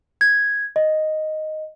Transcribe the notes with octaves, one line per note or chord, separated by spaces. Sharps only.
G#6
D#5